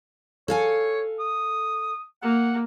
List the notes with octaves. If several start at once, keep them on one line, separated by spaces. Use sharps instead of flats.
A4 C#5 F5 G#5
D#6
A#3 F#5